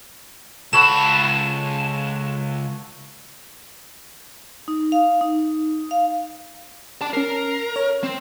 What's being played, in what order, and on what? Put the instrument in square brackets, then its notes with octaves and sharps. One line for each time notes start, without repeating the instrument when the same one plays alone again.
[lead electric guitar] C#2 B5 [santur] A4 C#5 F#5 [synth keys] E7
[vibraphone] D#4
F5
D#4
F5
[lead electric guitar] D5 A5
[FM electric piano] C#4 C7 [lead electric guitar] A#4
[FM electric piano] C#5
[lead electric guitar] C4